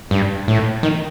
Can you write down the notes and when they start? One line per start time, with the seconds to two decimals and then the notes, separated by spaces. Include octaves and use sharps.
0.11 G2
0.48 A2
0.83 D#3